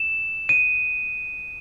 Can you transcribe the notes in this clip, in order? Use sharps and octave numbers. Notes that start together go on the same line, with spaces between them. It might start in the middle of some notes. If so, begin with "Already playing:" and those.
Already playing: E7
D#7